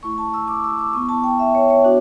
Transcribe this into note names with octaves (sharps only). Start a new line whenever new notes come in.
A3 E4 C#6
A5
E6
D6
E6
D6
B3 E4 C#6
A5
G5
E5
C#5
C#5
B3 D4 F#4